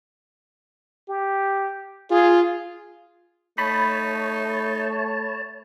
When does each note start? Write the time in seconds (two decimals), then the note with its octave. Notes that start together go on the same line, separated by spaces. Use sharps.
1.09 G4
2.11 F4 G#4
3.58 A3 D#4 C#5 A5 B5